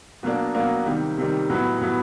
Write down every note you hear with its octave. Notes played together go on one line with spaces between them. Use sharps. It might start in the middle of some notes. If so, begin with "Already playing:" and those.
B2 F#3 A#3 D4
B2 F#3 A#3 D4
C3 D#3 G3
C3 D#3 G3
A2 F#3 B3
A2 F#3 B3